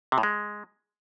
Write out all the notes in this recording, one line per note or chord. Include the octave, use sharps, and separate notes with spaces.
C3
A2
G#3